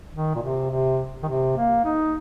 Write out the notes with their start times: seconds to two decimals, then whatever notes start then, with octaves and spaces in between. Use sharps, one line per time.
0.14 D#3
0.35 A#2
0.43 C3
0.71 C3
1.23 D#3
1.28 C3
1.57 A#3
1.85 D#4